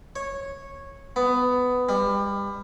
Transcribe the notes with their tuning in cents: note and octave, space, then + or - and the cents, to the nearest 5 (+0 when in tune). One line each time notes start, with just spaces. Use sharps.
C#5 -10
B3 +15
G3 +30